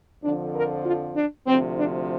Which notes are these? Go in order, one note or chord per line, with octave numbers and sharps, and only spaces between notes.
F2 D3 F3 D4
A#4
F4
D4
D2 C3 F3 C4
D4